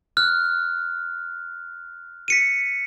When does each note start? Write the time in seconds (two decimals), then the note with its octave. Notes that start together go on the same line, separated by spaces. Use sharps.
0.17 F6 F#6
2.28 B6 C#7 D#7